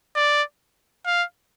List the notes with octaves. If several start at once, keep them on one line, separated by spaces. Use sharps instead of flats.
D5
F5